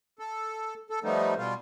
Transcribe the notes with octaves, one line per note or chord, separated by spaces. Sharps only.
A4
A4
F3 G3 A3 B3 D#4
B2 G3 F4